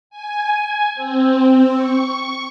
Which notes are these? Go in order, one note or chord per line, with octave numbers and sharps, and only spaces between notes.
G#5
C4
C#6